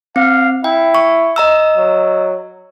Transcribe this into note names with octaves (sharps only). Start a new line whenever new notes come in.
C4 F5
E4 G5
C#6
D#5 A#5 E6
F#3